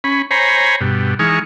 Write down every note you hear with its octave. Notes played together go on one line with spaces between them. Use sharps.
C#4 B5
C5 C#5 G#5 A#5 B5
G2 B2
E3 G#3 D#4 G#4 C#6 F6